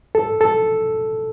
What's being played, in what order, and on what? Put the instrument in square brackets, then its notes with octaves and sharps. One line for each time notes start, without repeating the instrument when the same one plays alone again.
[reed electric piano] A4
A4